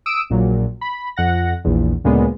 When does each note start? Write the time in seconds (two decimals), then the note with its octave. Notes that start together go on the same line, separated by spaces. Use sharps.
0.06 D#6 E6 D7
0.30 A#1 A#2 F#3
0.81 B5
1.16 F2 F#5 A#6
1.65 A#1 E2
2.04 D2 A#2 C#3 G#3 B3